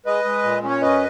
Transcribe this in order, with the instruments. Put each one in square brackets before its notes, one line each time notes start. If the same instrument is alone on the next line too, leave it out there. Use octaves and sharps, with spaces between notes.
[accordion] G#3 B4 D#5
G#3
A#2
C#4
C#5
F#2 B4 D#5